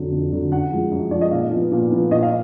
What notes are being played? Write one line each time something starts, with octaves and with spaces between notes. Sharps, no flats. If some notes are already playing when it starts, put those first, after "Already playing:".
Already playing: F2 D3 F#3 D4
F2
D3 F#3 D4
F#2 F#5
F3 G#3
F#2
F3 G#3 D5
D#5
A#2 F5
F3
B3
A#2
F3 B3
A#2 D#5
F5